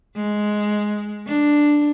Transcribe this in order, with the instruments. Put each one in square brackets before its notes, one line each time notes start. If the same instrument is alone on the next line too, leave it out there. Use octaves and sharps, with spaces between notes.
[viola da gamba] G#3
D4